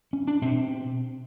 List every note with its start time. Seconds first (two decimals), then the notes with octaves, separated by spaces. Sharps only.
0.13 C#4
0.27 D4
0.41 B2 C4